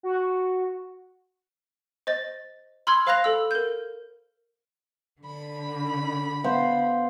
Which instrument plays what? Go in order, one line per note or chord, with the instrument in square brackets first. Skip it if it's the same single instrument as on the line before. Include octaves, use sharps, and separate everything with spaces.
[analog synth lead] F#4
[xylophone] C5 D#5 A6
B5 C6 E6 F6 G#6
C5 F5 B5 F#6 A#6 F7
A4 E6
A#4 G6
[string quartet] D3 B5
[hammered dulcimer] B3 C5 F5